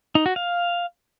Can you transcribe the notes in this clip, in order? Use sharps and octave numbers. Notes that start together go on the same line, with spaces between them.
D#4
F#4
F5